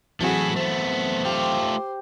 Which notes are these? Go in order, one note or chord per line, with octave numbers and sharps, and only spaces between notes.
E3 F#3 A3 C4 E4 F#4 G#4
A3 B3 C5
A3 F4 G4